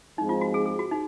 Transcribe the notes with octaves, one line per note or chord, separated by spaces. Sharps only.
G#2 F3 G#3 C4 D#4
F4
F#4
G#4
G#4
F#4
D#4